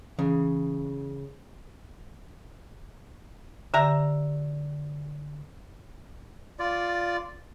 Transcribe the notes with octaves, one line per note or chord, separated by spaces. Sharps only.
C#3 E3
D3 G4 E5 A#5
F4 D5